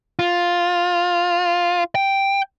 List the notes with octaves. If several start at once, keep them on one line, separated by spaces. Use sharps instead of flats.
F4
G5